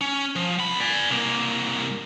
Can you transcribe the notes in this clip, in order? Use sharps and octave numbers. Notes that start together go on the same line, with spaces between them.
C#4
F3
C2 B5
D5 G#5
C2 A#3